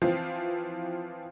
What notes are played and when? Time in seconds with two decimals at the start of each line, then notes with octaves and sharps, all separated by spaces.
0.02 E3 F3 C4 F4